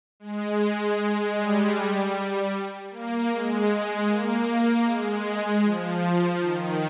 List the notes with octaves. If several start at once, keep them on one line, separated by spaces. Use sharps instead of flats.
G#3
G#3
G3
A#3
G#3
G#3
A#3
A#3
G#3
F3
D#3